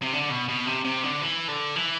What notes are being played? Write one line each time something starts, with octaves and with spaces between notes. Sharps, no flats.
C3
D3
B2
B2
C3
C3
D3
E3
D3
E3